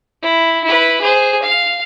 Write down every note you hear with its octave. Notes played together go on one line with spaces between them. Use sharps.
E4
E4 B4
G#4 C5
F5